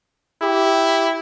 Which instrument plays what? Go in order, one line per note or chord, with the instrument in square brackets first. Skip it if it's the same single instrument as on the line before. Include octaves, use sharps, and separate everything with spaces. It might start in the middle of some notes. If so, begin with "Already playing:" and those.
[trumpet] E4 [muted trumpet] G4